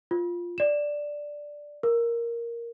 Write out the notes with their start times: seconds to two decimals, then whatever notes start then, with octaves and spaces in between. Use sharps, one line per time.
0.11 F4
0.58 D5 E7
1.83 A#4